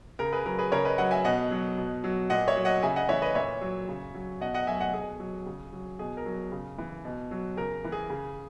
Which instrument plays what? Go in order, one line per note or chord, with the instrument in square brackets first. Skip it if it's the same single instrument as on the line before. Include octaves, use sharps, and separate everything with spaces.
[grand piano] C#3 A#4
G#4 B4
F#3 A#4
G#4 B4
C#3 A#4 C#5
B4 D#5
F#3 D#5 F#5
E5 G#5
B2 D#5 F#5
F#3
B2
F#3
A#2 D#5 F#5
C#5 E5
F#3
D#5 F#5
C#3 E5 G#5
D#5 F#5
E3 C#5 E5
B4 D#5
A#2 C#5 E5
F#3
C#3
F#3
B2 D#5 F#5
D#5 F#5
F#3 E5 G#5
D#5 F#5
B2 G#4
F#3
C#3
F#3
B2 G#4
A#4
F#3
C#3
E3
B2
F#3
C#3 A#4
E3
G#4
C#3